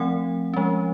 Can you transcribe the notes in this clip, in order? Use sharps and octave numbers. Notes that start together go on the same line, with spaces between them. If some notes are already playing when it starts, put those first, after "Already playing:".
Already playing: F3 A3 C4 F#5
F3 G#3 C#4